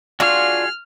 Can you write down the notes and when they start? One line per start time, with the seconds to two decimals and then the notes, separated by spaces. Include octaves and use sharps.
0.20 D4 F4 F#4 G#4 C#6 F6